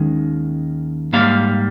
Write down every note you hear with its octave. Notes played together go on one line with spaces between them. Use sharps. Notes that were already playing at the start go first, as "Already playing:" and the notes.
Already playing: D#2 D#3 G#3 C#4
G#2 G3 A#3 F5